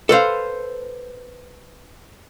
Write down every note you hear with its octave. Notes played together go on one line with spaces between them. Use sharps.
A4 B4 C5 F5